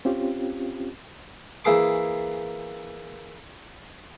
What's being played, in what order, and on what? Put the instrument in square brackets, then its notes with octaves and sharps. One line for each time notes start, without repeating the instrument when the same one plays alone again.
[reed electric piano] C4 C#4 F4 G4
[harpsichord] E3 A#3 G#4 C6 D6